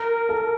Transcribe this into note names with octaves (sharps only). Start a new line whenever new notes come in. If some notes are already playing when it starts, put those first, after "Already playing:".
Already playing: A#4
A4